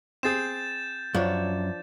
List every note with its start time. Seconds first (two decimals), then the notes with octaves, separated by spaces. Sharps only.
0.23 C4 G#4 G6 A6 E7
1.14 F#2 F3 D4 C#5